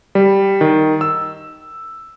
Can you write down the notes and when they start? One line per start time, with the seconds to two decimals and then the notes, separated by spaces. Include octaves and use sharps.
0.15 G3
0.61 D#3
1.01 E6